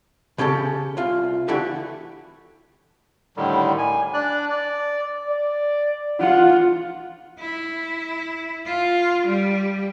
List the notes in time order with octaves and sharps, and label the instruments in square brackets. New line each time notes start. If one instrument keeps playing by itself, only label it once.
[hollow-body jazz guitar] C#3 C#4 G4 A4 A5
C2 F4
D3 E3 A3 F#4 G4 A4
[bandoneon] A2 D3 D#3 G3
G#5
D4 D5 F#6
D5
[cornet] D5
[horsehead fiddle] F4 [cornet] F#5
[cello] E4
F4
G3